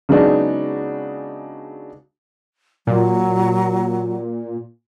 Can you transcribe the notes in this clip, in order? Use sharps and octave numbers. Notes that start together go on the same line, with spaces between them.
C#3 F#3 G#3 B3 D4 D#4
A#2 F#3